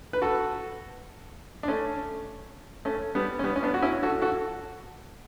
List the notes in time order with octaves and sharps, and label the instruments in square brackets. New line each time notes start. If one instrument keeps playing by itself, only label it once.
[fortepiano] B4
F#4 A4
D4
A3 C#4
A3 C#4
G3 B3
C#4
G3 B3
C#4
B3 D4
F#4
C#4 E4
F#4 A4
F#4 A4